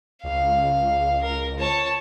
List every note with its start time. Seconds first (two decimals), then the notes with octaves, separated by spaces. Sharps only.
0.23 C#2 F5
1.22 A#4
1.59 C#5 A5